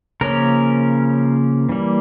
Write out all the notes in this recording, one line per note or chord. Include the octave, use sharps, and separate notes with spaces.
C#3 F3 A#3 C#4 A#4
E3 G3 A#3